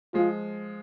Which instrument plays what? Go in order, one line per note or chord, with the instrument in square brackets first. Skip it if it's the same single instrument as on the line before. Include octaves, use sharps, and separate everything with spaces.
[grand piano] F3 G#3 [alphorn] F4